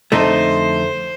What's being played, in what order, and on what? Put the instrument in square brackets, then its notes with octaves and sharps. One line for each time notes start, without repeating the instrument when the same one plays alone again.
[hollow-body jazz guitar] F2 D3 A3 D#4 [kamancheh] C5